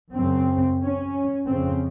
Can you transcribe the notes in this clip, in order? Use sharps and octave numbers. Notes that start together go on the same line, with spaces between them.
F#2 C#3 C4
C#4
F2 C#3 C4